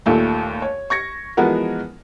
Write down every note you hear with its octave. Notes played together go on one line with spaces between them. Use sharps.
D#2 A#2 A3
C#5
C#6 G#6 A#6 C#7
E3 F3 G#3 B3 F#4 A#4